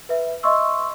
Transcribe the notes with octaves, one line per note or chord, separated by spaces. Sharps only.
B4 E5
D#5 E5 C6 C#6 E6